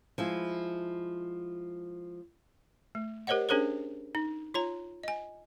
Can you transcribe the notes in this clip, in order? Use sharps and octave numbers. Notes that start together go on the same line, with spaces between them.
F3 G#3 E4
A3
G4 A#4 C5 C#5 D#5 F#5
C#4 D4 G#4 A#4 C5 C#5
D#4
F4 C#5 A#5
D#5 G#5